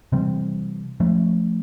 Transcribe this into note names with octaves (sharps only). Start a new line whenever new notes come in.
C3 E3 G3 C4
F3 A3 C#4